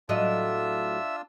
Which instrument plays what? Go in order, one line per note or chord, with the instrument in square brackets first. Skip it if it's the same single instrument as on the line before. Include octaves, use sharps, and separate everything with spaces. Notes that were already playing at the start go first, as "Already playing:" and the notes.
[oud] A2 F#3 D#5 [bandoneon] D4 F4 E6 [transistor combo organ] E5